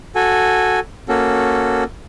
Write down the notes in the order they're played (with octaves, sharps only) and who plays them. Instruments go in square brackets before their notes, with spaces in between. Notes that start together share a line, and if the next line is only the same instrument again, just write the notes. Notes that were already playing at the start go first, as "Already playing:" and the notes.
[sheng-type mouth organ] F#4 A4 G#5
A#3 C#4 F#4 A4